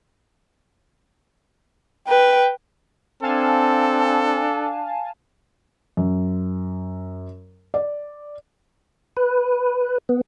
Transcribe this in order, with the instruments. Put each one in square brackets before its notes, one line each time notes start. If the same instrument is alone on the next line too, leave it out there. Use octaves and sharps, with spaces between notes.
[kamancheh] B4 [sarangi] G5
[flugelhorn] C4 [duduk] D4 [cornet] A4 [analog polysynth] F5 G#5 A5
[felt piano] F#2
D5
[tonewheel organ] B4
B3